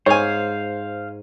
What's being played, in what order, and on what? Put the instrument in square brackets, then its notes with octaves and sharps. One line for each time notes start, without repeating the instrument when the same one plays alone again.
[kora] G#2 [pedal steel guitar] C5 F5 [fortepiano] C#5 G#5